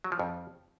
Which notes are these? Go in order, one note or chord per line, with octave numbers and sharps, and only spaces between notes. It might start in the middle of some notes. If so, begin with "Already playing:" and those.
F#3
F3
F2